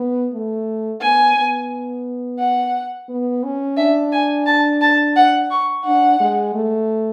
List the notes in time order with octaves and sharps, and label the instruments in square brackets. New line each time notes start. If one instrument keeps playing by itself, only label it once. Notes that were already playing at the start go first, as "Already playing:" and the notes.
Already playing: [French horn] B3
A3
[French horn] B3 [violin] G#5
[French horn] B3
[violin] F#5
[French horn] B3
C#4
[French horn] D4 [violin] E5
[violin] G#5
A5
A5
F#5
C#6
[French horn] D4 [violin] F#5
[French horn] G#3
A3